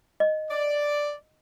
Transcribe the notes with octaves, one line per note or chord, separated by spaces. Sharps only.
D#5
D5